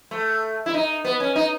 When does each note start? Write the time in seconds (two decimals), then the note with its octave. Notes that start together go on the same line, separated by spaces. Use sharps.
0.11 A3
0.66 E4
0.74 D#4
1.05 B3
1.20 C#4
1.36 D#4